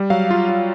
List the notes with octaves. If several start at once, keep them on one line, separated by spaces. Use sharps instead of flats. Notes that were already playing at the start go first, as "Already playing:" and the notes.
Already playing: G3
F#3 F5
F4
F4